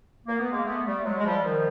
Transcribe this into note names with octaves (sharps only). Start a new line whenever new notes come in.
A#3
B3
G#3 A#3
A3 B3
G3 A3
F#3 G#3
G#3
F3 G3
D#3 F3